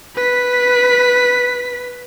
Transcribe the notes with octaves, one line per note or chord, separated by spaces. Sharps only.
B4 B6